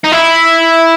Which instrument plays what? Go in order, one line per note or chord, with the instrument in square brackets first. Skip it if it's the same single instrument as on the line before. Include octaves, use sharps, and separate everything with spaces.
[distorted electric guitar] D#4
E4